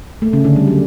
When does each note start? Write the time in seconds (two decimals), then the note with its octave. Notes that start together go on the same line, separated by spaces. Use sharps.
0.22 A3
0.33 C#3 C#4
0.44 D3 D4
0.56 G3
0.67 F#3